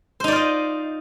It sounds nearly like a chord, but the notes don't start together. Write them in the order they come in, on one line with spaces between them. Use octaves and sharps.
C5 D#4 D5 F4 D#5